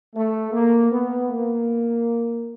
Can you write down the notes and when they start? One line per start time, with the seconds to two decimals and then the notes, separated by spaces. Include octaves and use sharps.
0.15 A3
0.52 A#3
0.91 B3
1.29 A#3